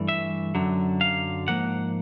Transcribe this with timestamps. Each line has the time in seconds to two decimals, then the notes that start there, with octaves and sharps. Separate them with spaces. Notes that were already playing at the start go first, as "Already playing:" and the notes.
Already playing: G2 E3 A3
0.08 E5
0.55 F#2 D3 F#3
1.01 F5
1.48 G#2 F3 A#3 F#5